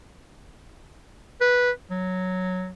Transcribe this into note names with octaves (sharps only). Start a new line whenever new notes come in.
B4
F#3